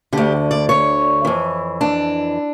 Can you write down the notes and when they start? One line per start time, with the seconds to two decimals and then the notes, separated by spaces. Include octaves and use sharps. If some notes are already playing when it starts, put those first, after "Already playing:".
0.13 D2 D3 G4
0.51 D5
0.69 C#5
1.25 F2 E3
1.81 D4